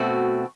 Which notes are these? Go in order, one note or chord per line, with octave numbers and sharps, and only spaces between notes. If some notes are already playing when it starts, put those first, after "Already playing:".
Already playing: B2 A3 C4 F#4